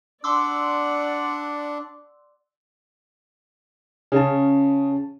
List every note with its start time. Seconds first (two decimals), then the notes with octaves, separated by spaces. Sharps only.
0.24 D4 D5 F#5 C6 D6 E6
4.12 C#3 C#4 G#4 A5